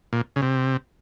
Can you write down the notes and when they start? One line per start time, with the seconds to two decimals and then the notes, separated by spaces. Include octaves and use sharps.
0.13 A#2
0.36 C#3
0.42 C3